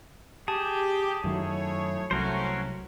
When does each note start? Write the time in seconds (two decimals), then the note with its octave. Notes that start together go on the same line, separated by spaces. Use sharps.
0.48 G4 G#4 A5
1.24 F#2 D#3 F#3 A3 E4 C#5
2.11 C2 F#3 A3 C#4 F#4 A#4 C5